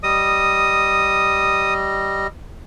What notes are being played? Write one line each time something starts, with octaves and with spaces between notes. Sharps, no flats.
G3 D#5 D#6